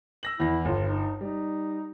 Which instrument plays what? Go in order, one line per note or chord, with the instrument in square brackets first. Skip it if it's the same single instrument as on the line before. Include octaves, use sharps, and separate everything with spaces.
[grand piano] E6 A#6 F#7
[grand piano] E2 A#6 [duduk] E4
[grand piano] G1 [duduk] F4
[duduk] D#4
[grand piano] G3 [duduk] D#4